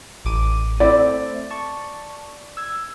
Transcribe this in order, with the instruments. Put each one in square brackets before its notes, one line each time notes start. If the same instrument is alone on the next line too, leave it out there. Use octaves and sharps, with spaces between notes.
[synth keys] A1 D6 D#7
[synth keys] A3 C4 E4 [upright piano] D5
[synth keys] A5 C#6
E6 G#6